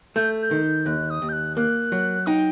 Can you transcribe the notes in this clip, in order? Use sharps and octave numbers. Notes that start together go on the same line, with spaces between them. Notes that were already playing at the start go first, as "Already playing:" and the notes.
A3 G6
G6
D#3
D#2 F#6
D#6
D#2
G6
F#6
A#3 F#6
F#3
D#4 G5